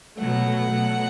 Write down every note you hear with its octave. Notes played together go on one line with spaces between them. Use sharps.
B2 F#3 A3 F#5
B2 F#3 A3